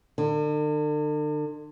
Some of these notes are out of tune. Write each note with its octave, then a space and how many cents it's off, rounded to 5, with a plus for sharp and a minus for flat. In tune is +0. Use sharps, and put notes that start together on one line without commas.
D3 +40